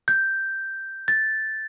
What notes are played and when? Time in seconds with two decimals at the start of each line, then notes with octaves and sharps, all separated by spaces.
0.08 G6
1.08 A6